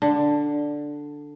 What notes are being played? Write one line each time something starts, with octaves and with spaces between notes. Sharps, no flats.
D3